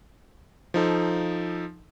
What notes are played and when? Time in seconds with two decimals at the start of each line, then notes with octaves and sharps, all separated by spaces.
0.74 F3 D#4 A4